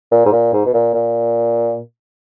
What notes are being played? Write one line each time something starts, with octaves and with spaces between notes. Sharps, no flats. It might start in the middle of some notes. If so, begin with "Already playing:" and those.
A#2
G#2
A#2
G#2
B2
A#2
A#2